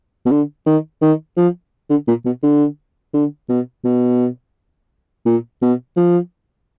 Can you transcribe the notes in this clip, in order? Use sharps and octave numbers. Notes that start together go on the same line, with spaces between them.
B2
D3
D#3
D#3
F3
D3
A#2
B2
D3
D3
B2
B2
A#2
B2
F3